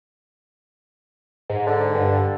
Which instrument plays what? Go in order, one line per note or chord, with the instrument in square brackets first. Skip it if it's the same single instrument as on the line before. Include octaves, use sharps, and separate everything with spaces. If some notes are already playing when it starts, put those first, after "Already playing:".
[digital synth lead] G#2
[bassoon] D3
[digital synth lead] G2